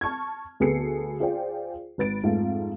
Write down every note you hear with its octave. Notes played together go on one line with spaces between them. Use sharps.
A5 C#6 F6 G#6
D2 B3 G#4 A4 C7 C#7
F4 G#4 C5 D5 G5
G#1 B4 A6 D7
F2 G#2 A3 F5